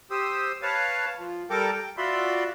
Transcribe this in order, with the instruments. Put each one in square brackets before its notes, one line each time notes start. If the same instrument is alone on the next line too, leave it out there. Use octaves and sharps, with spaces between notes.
[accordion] G4 C5 D#6 E6
B4 C#5 F5 A5
F3
G3 A4 A#4 G5 D6
G5
F4 F#4 D5 E5 B5 C6